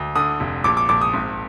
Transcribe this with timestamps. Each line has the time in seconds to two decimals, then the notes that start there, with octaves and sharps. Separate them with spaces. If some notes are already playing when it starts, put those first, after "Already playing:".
Already playing: D2
0.15 D3 D#6
0.40 F1
0.64 A#1 D6
0.77 D6
0.89 A#1 D6
1.01 D#6
1.14 G#1